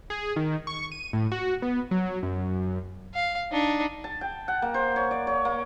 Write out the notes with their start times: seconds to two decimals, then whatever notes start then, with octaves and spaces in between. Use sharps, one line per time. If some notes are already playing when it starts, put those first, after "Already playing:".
0.10 G#4
0.36 D#3
0.67 C#6
0.92 D#7
1.13 A2
1.32 F#4
1.62 B3
1.91 F#3
2.23 F#2
3.14 F5
3.51 D4 D#4
4.04 A5
4.21 G5
4.48 F#5
4.62 A#3
4.74 C5
4.96 C#5
5.11 D5
5.27 C#5
5.45 A#3